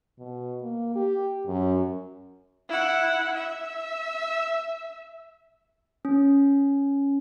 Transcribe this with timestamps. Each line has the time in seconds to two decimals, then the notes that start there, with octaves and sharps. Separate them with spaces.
0.18 B2
0.62 A#3
0.95 G4
1.47 F#2
2.69 E4 F#5
3.34 E5
6.05 C#4